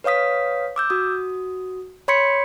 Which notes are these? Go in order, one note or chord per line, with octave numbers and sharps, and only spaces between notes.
B4 C#5 F5 D#6 B6
D6 E6 G6
F#4 D#6
C#5 B5 C6 G#6 B6 C#7